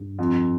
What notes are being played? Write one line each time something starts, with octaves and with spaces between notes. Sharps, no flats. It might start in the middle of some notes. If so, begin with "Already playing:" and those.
Already playing: G2
F2